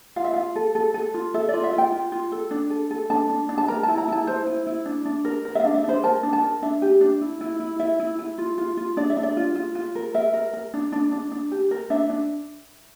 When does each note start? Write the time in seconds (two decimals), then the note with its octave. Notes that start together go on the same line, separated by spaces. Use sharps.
0.16 F4 F5
0.24 E5
0.33 F4 F5
0.56 A4
0.75 A4
0.94 A4
1.14 F4
1.34 A4 E5
1.49 F4 D5
1.63 E5
1.73 F4
1.78 G5
1.92 F4
2.12 F4
2.32 A4
2.51 D4
2.70 A4
2.91 A4
3.10 D4 A5
3.30 D4
3.49 D4
3.58 A5
3.68 A#4 A#5
3.83 E4 A5
3.98 A#5
4.08 E4 A5
4.27 E4 C5
4.47 E4
4.67 E4
4.86 D4
5.05 D4
5.25 A#4
5.45 A#4
5.55 E5
5.60 F5
5.65 D4
5.74 E5
5.84 D4 C5
6.03 A#4 A5
6.23 D4
6.33 A5
6.43 A#4
6.62 D4 E5
6.82 G4
7.01 D4
7.21 E4
7.41 E4
7.60 E4
7.79 E4 E5
7.99 E4
8.19 E4
8.38 F4
8.58 F4
8.77 F4
8.97 D4 D5
9.10 E5
9.17 D4
9.23 D5
9.37 F4
9.55 F4
9.75 F4
9.95 A#4
10.14 A#4 E5
10.34 A#4
10.54 A#4
10.74 D4
10.92 D4
11.12 D4
11.32 D4
11.51 G4
11.71 A#4
11.90 D4 E5
12.10 D4